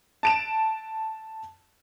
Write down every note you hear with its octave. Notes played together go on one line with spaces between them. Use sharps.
A5 D7 E7